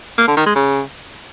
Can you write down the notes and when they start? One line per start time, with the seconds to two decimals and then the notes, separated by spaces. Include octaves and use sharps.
0.18 A#3
0.27 D3
0.37 D#3
0.46 G#3
0.55 C#3